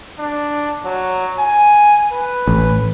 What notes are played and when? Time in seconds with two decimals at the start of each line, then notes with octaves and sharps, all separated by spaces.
0.19 D4
0.85 F#3
1.39 G#5
2.12 B4
2.47 A1